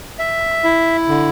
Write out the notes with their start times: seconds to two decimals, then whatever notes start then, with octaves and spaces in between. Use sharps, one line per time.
0.19 E5
0.64 E4
1.08 D3